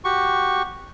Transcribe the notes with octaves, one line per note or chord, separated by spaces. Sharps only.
F#4 G4 C#6